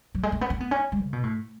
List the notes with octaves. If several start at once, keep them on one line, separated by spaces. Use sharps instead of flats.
F#3
G#3
A3
B3
C#4
B3
C#4
G#3
C#3
B2
A2